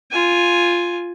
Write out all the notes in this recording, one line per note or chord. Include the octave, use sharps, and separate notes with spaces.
F4 G#5